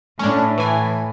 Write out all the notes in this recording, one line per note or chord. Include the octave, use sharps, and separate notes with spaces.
A2 C#4 D4
E3 G#5